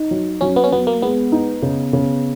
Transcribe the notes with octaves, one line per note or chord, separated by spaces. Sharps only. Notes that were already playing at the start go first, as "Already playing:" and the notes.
Already playing: D#4
F#3
F#3 C#4
B3
C#4
F#3 B3
A#3
G#3 B3
D#4
C#3
C#3